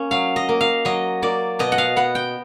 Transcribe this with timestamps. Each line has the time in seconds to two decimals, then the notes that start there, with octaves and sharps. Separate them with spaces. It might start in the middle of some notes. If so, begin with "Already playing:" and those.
Already playing: A#3 C#4
0.11 F#3 F5
0.36 D#5
0.49 A#3
0.61 F5
0.85 F#3 D#5
1.22 A#3 D5
1.59 B2 D#5
1.72 F#5
1.78 F5
1.96 B3 F#5
2.15 G5